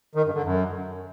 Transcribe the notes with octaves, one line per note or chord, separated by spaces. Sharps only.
D#3
G2
D3
F#2